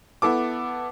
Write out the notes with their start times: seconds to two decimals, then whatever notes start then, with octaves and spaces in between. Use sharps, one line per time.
0.22 B3 E4 A4 D6